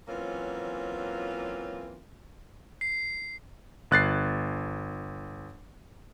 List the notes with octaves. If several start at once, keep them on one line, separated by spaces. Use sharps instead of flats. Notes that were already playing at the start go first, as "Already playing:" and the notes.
E3 F#3 A#3 C4 C#4 F4
C7
G1 F#6 A6 C7